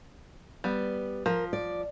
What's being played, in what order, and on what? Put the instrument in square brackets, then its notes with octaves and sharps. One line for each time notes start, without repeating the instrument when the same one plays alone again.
[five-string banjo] G3 B3
[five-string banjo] F3 [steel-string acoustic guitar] A#4
[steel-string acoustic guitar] D5